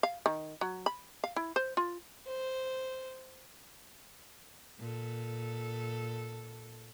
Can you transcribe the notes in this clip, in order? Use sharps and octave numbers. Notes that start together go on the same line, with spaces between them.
F5
D#3
F#3
B5
F5
E4
C5
F4
C5
A#2 A4